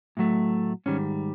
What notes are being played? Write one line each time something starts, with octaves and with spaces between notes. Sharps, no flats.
A2 F#3 A3
G#2 D#3 G3 C#4